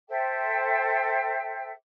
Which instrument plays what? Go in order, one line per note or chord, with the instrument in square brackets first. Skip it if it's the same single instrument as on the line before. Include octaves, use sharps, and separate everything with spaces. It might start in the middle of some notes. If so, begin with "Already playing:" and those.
[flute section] A4 C5 E5 G5